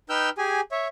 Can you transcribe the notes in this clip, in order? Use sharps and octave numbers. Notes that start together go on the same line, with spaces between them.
D#4 B4 G5 E6 F6 G6
G4 G#4 G#5
C#5 E5